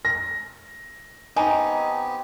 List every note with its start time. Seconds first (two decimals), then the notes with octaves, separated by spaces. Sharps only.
0.05 A#6
1.36 B3 C4 D#4 G4 G#5